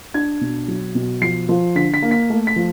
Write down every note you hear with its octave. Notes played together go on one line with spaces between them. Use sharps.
D4 G#6
B2
F#3
B2
F3 C7
F3
D3 B6
B6
A#3
B6
A3
B6
F3